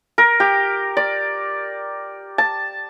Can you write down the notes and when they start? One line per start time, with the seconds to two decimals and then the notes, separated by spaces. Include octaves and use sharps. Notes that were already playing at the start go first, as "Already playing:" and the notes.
0.18 A#4
0.40 G4
0.97 D5
2.38 A5